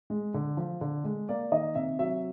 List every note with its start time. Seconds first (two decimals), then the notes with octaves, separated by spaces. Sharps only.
0.10 G#3
0.34 D3
0.57 F3
0.81 D3
1.04 G#3
1.29 A#3 D5
1.52 D#3 D#5
1.75 C3 E5
1.99 F#3 E5